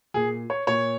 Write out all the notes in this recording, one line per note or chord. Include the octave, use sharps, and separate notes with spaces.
A#2 G#4
C#5
A#2 C#5